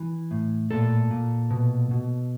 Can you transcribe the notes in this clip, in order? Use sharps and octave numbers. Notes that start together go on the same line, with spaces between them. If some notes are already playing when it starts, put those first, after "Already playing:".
Already playing: E3
A2
A#2 A4
A#2
B2
B2